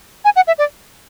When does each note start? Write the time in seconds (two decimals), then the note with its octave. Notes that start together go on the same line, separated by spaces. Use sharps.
0.25 G#5
0.36 F#5
0.47 E5
0.58 D5